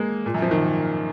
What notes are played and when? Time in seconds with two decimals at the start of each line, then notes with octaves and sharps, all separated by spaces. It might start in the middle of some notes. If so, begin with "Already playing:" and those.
Already playing: G#3 A#3
0.26 A#2
0.34 F#2
0.42 F3
0.51 D#3